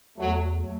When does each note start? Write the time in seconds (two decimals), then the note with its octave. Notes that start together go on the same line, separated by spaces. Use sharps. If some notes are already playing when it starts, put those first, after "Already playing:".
0.17 E2 F#3 A3
0.62 F#3 A3